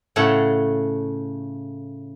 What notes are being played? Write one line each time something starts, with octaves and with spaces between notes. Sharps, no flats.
A2 C#3 A3 A4 F#5